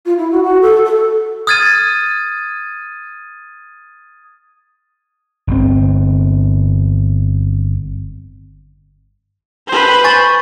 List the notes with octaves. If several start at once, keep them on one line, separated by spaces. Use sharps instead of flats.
F4
E4
F#4
F#4
A4
A4
D#6 F6 G#6 A6 D#7
G1 C4
B4 C5
G#5 C#6 A6